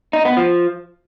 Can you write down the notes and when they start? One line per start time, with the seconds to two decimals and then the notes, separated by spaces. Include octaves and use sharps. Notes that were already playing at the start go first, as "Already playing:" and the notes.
0.13 D#4
0.25 B3
0.37 F3